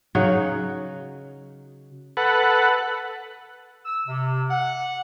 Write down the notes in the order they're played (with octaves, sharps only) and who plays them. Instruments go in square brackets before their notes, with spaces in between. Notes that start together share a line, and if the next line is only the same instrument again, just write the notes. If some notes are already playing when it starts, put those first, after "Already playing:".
[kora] C#3 F#3 D#4 F#4
[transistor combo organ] A4 B4 F#5
[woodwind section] E6
C3
F#5